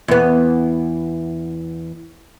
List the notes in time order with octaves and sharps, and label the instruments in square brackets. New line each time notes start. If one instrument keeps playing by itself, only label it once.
[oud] E2 B3